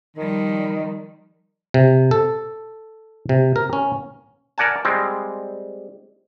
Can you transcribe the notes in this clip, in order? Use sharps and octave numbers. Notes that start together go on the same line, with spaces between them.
D#3 F3 G3
C3
A4
C3
A#4
C#4
A#4 D5 F#5 G#5 A5
G3 G#3 C4